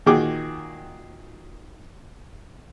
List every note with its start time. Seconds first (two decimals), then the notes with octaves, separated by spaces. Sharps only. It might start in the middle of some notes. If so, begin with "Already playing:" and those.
0.06 A#2 D#3 F#4 G#4 G5 D6